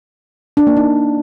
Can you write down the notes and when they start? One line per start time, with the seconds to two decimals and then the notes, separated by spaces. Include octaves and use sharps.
0.57 D4
0.67 A#3
0.77 D#4